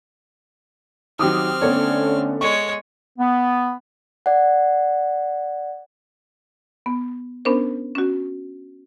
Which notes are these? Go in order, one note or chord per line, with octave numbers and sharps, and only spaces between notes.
D#3 F#3 C4 G4 D6 D#6 F6
D3 A3 B3 C#4 A4 C#5 D5
G#3 C#5 C#6
B3
D5 F#5
B3
B3 C#4 D4 A#4 C5
C#4 F#4